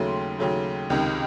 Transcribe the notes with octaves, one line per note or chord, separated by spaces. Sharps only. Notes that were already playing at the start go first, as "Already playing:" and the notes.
Already playing: D#2 C#3 F#3 A3 C6
D#2 C#3 F#3 A3
C#2 C3 D#3